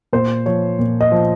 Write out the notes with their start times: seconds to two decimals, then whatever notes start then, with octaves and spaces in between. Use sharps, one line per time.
0.13 A#2 C5
0.46 F3 C#5
0.79 A#2
1.01 D#5
1.12 F3